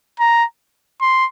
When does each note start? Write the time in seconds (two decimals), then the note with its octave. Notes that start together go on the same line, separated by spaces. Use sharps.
0.20 A#5
1.01 C6